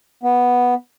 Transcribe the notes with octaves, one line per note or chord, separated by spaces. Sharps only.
B3